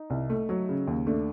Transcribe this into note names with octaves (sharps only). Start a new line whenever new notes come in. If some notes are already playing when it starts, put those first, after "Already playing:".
Already playing: D#4
C2
A3
F#3
C#3
D#2
A3 D4